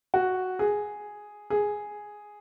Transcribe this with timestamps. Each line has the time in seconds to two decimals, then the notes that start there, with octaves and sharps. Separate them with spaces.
0.14 F#4
0.59 G#4
1.50 G#4